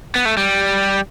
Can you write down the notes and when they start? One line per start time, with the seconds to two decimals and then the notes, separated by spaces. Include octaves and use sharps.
0.16 B3
0.25 A3
0.37 G3